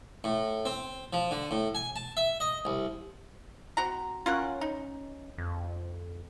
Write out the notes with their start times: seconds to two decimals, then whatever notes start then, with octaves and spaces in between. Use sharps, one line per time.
0.24 A2
0.65 C4
1.13 F3
1.31 D3
1.51 A2
1.75 G#5
1.96 A5
2.17 E5
2.40 D#5
2.65 C2
3.77 C4 F#4 A#5
4.26 C#4 F4 A#4 F#5
4.61 D#4
5.38 F2